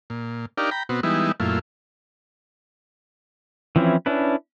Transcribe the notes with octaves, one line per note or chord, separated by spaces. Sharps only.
A#2
D4 D#4 G4 A#4 D5 F5
G5 A#5 B5
B2 B3 C4 F#4
E3 G3 G#3 B3 D#4 E4
F#2 A#2 A3 E4 F4
E3 F3 C4 C#4 E4
C#4 D4 E4 B4